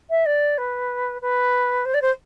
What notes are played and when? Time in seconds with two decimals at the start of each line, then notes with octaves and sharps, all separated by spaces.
0.10 E5
0.26 D5
0.58 B4
1.22 B4
1.85 C5
1.94 D5
2.02 C5